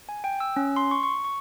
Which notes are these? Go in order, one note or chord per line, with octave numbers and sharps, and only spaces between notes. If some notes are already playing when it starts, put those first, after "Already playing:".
G#5
G5
E6
C#4
C6
C#6
C#6
C#6